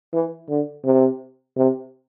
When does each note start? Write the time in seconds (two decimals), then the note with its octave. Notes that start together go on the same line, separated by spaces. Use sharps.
0.13 E3
0.49 D3
0.85 C3
1.57 C3